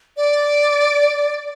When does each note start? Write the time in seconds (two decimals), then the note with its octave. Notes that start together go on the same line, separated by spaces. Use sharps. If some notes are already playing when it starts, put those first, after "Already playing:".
0.17 D5